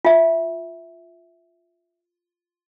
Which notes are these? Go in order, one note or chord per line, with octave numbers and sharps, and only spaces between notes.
F4 E5